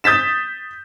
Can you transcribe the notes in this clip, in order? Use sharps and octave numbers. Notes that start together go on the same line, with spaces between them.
D#6 G6 A6 B6 E7